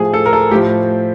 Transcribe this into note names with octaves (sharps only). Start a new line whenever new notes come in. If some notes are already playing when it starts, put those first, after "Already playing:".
Already playing: A2 F3 G#4
A4
A#4
A4
A2 F3 G4